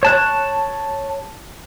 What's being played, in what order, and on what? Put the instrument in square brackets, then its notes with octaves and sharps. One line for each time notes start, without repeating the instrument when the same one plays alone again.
[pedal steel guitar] C#5 A5 F#6